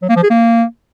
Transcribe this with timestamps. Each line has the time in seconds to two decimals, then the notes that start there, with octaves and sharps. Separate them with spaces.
0.02 F#3
0.09 A#3
0.16 F3
0.23 G#4
0.30 A#3